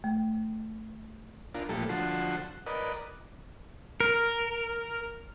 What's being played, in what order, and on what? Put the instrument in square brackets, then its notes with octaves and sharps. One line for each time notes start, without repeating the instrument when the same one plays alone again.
[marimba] A3
[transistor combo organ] D4 F4 A#4
A#2 F3 G3 A3 A4
D3 F3 F#4 A5 C6
A#4 B4 D5 D#5
[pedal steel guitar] A#4